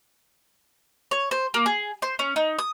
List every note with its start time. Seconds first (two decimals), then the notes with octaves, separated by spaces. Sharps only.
1.11 C#5
1.31 C5
1.54 A#3
1.66 G#4
2.02 C5
2.19 C#4
2.36 D#4
2.59 D#6